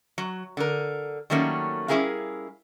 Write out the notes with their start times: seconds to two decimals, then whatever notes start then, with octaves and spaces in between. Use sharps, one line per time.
0.18 F#3
0.57 D3 A#4
1.30 D#3 F#3 G3 A3 A#3 C#4
1.88 G3 C#4 E4 G#4 A#4 F5